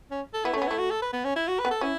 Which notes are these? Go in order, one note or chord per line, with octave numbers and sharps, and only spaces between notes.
C#4
A4
B3 E4
A3
C#4
B3
A3 E4
F#4
A4
B4
B3
C#4
E4
F#4
B4
B3
A4
C#4 E4